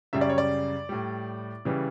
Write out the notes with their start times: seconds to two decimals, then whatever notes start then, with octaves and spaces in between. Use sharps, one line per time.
0.13 F#2 C#3 G3 E5
0.21 D5
0.30 C#5
0.38 D5
0.89 A2 G3
1.65 C#3 E3 G3